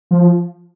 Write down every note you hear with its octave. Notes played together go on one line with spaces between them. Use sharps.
F3